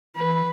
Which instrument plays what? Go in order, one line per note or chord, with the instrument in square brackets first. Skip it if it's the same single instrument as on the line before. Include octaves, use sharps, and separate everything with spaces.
[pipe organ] E3 [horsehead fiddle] B4